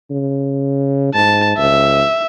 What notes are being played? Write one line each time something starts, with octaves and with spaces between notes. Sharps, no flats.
C#3
G#2 A5
C#2 E5